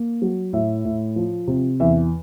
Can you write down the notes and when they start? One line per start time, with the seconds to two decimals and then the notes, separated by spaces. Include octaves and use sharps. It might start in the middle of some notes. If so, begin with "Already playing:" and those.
Already playing: A#3
0.22 F#3
0.53 A2 E5
0.85 A2
1.16 F3
1.47 C3
1.80 E2 E5